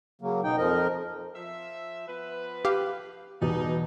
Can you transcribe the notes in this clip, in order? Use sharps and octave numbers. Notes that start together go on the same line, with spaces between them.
C#3 F#3 A#3
B2 D#4 G5
F2 F3 A#4 D#5
F3 E5
F3 B3 B4
G4 F5
E2 B2 G3 D#4